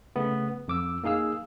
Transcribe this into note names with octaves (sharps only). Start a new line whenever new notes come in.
C#3 A3 B3
F2 D6 E6
A#3 D#4 G#4 F5 E6